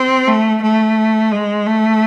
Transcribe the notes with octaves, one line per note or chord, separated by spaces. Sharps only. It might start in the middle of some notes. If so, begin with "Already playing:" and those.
Already playing: C4
A3
A3
G#3
A3